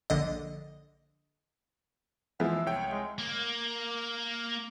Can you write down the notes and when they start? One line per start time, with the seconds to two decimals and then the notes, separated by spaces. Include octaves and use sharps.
0.10 A#1 D3 D#5
2.40 E2 F3 G#3 E5
2.66 C2 C#5 G5
2.91 G#3
3.18 A#3